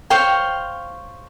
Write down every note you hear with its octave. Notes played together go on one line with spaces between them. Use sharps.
C5 C#5 F5 G5